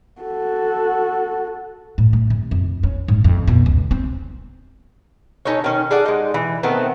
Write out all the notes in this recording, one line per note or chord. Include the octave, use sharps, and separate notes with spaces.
F#4 A4
A2
A3
C3
F2
C#4
G#2
F2
B2
C#2
C4
C#4 D#4 A4 C#5
D#3 C#4
G#4 A4 D5 F#5
G#3 D#4
E3
D#3 A3 B3 C4